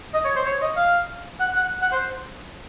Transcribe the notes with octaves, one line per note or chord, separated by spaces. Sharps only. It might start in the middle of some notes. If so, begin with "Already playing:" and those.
D#5
C#5
C5
C#5
D#5
F5
F#5
F#5
F#5
C5